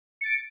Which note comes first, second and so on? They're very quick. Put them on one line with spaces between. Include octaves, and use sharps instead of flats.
C#7 A6 D7